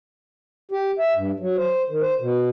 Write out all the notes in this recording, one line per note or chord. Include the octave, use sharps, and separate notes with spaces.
G4
E5
G2
F#3
C5
D#3
C5
B2